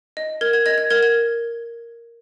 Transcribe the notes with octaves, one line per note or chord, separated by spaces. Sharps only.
D#5
A#4 G#6
G#6
D#5 G#6
G#6
A#4 G#6
G#6